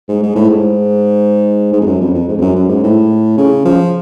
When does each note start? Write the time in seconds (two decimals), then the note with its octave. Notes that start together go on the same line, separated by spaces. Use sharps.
0.08 G#2
0.22 G#2
0.35 A2
0.49 G#2
1.73 G#2
1.81 F2
1.87 F#2
2.00 F2
2.14 F2
2.28 G#2
2.38 F2
2.41 F#2
2.55 F#2
2.68 G#2
2.83 A2
3.37 C#3
3.65 F3